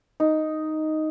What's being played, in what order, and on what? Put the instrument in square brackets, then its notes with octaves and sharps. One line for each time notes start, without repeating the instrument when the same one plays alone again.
[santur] D#4